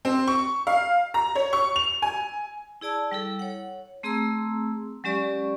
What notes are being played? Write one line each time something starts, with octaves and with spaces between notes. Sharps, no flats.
C4
C#6
F5
A#5
C#5
C#6
F7
G#5
E4 G#4 D5 A5 E6
G3 E4 A4
C#5 F#5
A3 C4 G#4 A#5 C6 E6
F#3 G#3 C#4 G4 D5 C#6